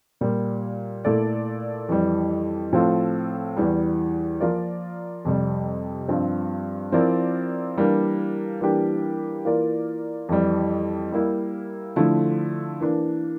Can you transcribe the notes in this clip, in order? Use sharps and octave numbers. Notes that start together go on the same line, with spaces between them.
A#2 G3 A#3
A#2 A3 E4 A4 D5
F2 E3 G3
A2 F3 C4 F4 A4
E2 E3 G3
F3 A#3 F4 A#4 D5
F2 C3 G3
G2 F3 C4
F3 C4 E4 A#4 D5
E3 G3 A#3 D4
E3 G3 A#3 D4 G4
E3 A#3 F4 A#4 D5
F2 E3 G3
G3 A#3 E4
D3 F3 A3 E4
E3 A#3 D4